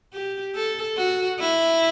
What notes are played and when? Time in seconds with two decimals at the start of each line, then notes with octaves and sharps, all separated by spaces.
0.13 G4
0.55 A4
0.97 F#4
1.40 E4